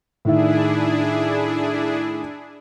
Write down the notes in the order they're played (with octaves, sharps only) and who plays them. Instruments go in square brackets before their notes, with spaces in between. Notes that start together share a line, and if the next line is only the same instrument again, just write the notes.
[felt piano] A2 D#3 E5 [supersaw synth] D4 E4 G#4